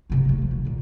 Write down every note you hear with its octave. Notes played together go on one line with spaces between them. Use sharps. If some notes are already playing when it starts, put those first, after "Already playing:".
D2 C3
C#3 A3
C3 F3
B2
A#2 C#3